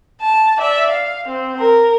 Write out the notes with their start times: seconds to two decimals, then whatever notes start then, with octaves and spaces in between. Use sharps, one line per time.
0.21 A5
0.58 D5 E5
0.90 F5
1.28 C4
1.59 A#4